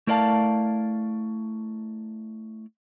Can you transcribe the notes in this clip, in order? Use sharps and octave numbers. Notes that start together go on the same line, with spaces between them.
A3 E4 A#4 D5 F5 A5